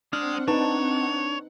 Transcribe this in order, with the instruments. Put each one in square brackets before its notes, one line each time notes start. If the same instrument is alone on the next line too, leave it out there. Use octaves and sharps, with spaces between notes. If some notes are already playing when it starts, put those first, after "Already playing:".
[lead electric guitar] G#3 [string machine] C4 F#5 [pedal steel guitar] D4 F6
[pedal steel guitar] D4 A5 [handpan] D#4 B4 [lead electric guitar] C#5